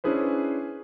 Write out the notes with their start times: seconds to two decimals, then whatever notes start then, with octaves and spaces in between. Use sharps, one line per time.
0.04 C#4 D4 E4 G#4 B4 C5